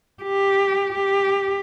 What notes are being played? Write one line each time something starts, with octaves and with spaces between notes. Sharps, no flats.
G4
G4